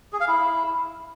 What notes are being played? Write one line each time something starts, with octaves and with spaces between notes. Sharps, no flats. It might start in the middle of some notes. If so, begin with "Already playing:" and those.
G#4
F5
E4